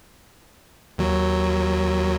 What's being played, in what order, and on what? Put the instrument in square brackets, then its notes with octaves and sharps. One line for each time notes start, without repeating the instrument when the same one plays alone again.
[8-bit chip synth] D#2 F#3